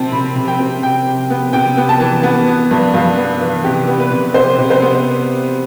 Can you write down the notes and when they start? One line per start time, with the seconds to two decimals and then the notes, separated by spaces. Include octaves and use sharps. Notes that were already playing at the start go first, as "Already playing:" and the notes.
Already playing: C3 C4 A5
0.12 C3 B5
0.36 C3
0.48 G5
0.59 C4
0.82 C3 G5
1.07 C3
1.30 B3
1.53 C3 G5
1.77 B3
1.89 A5
2.00 E3
2.24 B3
2.47 B3
2.71 G2
2.94 G2 F5
3.17 B3
3.41 E3
3.64 C3 G4
3.88 B3
4.00 B4
4.12 C3
4.34 C3 C5
4.59 C3
4.70 C5
4.82 B3